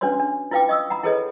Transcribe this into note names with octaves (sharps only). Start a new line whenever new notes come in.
C#4 D4 F#4 B4 C#5 C6
D4
E4 F4 B4 F5 G5 D6
D#5 C#6 D#6 E6
F#5 A#5 B5
E4 G#4 A4 B4 C#5 D#5